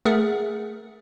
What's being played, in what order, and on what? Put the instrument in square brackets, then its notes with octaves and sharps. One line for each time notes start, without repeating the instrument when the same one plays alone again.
[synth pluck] A3 G#4 A#4 F#5